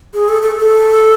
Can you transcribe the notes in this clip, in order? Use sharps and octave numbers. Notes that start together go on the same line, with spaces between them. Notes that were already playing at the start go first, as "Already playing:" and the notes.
G#4
A4
A4
A4